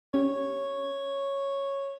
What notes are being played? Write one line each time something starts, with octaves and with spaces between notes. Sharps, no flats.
C#4 G4 C#5